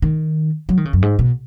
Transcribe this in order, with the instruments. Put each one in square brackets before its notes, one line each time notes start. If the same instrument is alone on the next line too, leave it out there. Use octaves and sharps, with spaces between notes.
[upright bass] D#3
F#3
D#3
C#3
F#2
G#2
B2